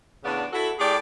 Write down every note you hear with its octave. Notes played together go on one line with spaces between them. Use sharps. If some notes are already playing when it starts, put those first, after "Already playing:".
E2 A2 C#3 B3 D4 D5
E4 F#4 A4
A2 G4 G#4 D5